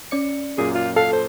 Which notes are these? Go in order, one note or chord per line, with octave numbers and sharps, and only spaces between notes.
C#4 D5 C#7
F#2 A#2 A#3 G#4
F4
A4 F5
C5